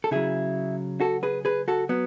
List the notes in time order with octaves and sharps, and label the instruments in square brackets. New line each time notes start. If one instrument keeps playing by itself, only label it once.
[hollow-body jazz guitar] A4
C#3 F#3 E4 G#4
F#4 A4
G#4 B4
G#4 B4
F#4 A4
F#3 B3